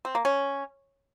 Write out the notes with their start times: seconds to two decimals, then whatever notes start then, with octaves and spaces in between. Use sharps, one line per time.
0.05 C4
0.15 A#3
0.25 C#4